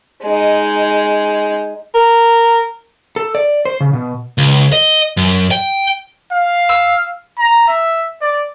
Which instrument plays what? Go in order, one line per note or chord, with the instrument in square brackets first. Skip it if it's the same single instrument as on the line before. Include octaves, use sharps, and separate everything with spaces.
[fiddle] G#3 D#4
[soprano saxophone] A#4
[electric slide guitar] A4
D5
C5
C#3
B2
[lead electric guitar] C#2
D#5
F#2
G5
[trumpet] F5
[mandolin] E6
[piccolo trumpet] A#5
E5
D5